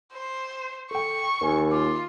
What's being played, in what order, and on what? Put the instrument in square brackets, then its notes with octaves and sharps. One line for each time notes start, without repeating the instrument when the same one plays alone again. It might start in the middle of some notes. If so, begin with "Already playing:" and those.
[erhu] C5
[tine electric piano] A4 G5 [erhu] C#6
[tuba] D#2 [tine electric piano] A#4 G#5
[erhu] F4 [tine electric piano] D6